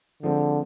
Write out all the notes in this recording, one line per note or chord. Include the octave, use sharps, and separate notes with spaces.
D3 F3 G#3 C4